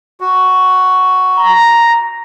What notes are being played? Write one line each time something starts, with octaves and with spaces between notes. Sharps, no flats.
F#4
A#5